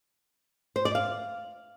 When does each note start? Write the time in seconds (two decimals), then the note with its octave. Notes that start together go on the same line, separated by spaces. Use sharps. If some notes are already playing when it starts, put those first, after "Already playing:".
0.76 C5
0.85 D5
0.95 F5